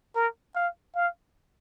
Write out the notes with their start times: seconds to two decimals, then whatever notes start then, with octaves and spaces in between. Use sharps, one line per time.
0.15 A#4
0.56 F5
0.96 F5